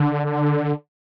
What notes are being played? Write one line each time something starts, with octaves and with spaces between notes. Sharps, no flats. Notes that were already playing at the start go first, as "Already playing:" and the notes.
Already playing: D3